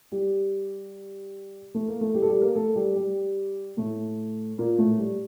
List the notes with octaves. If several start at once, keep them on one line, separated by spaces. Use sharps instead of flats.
G3 G4
A3 A4
A#3 A#4
A3 A4
G3 G4
A4
G3 G4
A#3 A#4
A3 A4
G3 G4
G3 G4
A2 A3
A#2 A#3
A2 A3
G3